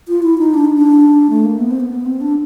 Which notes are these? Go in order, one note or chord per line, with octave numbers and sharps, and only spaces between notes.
F4
E4
D#4
D4
D#4
D4
A3
A#3
B3
C4
B3
B3
C4
D4